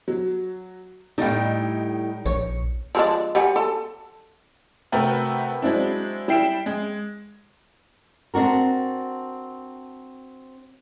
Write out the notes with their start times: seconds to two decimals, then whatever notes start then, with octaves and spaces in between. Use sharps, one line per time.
0.08 F#3
1.18 A2 G3 D#4 G5
2.26 A#1 C#5
2.95 F3 G#3 D4
3.35 G3 F#5 G#5
3.56 A4
4.92 C3 A3 F#4 A#4 B4 G5
5.62 F#3 G#3 C4 D4 E4
6.28 G3 E4 G5 C7 D7 E7
6.66 G#3
8.34 C4 D4 F#4 A#4